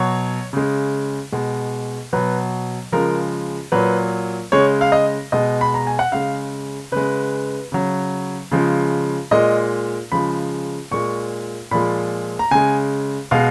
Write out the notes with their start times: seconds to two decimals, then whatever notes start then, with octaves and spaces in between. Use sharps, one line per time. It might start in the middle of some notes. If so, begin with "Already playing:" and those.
Already playing: B2 F#3 C#5
0.53 C#3 G#3
1.32 B2 G#3
2.13 B2 F#3 B4
2.92 C#3 F3 G#3 A#4
3.72 A#2 F#3 B4
4.52 C#3 G#3 C#5
4.81 F5
4.92 D#5
5.32 B2 G#3 D#5
5.61 B5
5.74 A#5
5.87 G#5
5.99 F#5
6.12 C#3 G#3 F5
6.92 C#3 G#3 B4
7.72 C#3 F#3
8.52 C#3 F3 G#3
9.31 A#2 G#3 D#5
10.12 C#3 F3 G#3 B5
10.91 A#2 G#3 C#6
11.71 A#2 F3 G#3 B5
12.39 A#5
12.51 C#3 G#3 G#5
13.31 B2 G#3 F5